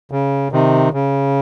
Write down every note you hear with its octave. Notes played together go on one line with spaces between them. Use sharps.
C#3
C3 D#3
C#3